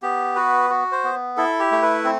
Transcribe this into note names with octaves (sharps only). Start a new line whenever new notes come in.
B3 G4
F#4 B4
F#4
C5
B3
E4 A4
G4
A3
B4
C4